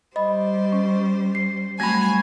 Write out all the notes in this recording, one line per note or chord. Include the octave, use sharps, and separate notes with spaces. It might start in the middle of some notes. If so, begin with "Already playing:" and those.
G3 C5 D#5 B5
C#4
C7
F#3 G3 A3 C4 F#4 G#5 B5 G#6